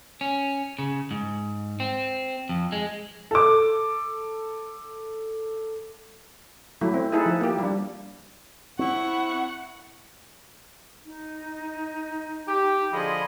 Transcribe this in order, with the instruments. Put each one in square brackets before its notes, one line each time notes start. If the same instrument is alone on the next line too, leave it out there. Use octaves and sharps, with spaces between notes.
[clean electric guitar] C#4
C#3
G#2
C4
F2
G#3
[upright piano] A4 D6
[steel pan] F#3 A3 E4
C4
D#4 E4 G#4 A4 B4
F3
A#3 G4
G3 D4
[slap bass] C4 [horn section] E4 [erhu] F#5 [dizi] C#6
[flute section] D#4
[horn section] G4
[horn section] D3 F3 D#5 [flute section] G#4 B5 C6